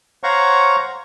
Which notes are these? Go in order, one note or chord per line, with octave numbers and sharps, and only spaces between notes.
C5 C#5 F5 F#5 A#5 C#6